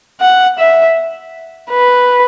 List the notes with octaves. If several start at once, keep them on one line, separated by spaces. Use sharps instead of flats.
F#5
E5
B4